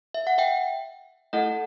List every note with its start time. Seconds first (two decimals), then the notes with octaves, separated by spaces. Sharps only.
0.14 E5
0.27 F#5
0.38 E5 G5
1.33 A3 E4 A4 D#5 F#5